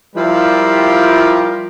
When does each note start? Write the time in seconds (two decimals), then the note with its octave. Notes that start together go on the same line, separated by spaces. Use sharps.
0.15 F3 G3 E4 F4 G4 A#4